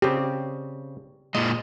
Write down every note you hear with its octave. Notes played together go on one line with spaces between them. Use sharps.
C#3 C4 G4
A#2 G#3 D#5